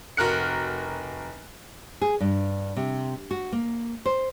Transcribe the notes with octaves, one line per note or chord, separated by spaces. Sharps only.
F1 F#4 A#4 F6 F#6 C#7
G#4
G2
C3
F#4
A#3
C5